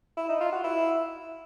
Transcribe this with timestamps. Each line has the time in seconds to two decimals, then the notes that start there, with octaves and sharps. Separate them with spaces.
0.17 E4
0.29 D#4
0.41 F4
0.52 F#4
0.64 E4